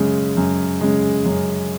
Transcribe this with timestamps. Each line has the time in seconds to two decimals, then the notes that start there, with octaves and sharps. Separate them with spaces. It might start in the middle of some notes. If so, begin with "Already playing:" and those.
Already playing: F#2 C#3 G#3
0.37 F#2
0.81 C#3 G#3
1.25 F#2